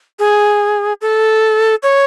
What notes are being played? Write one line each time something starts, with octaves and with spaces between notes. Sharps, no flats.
G#4
A4
C#5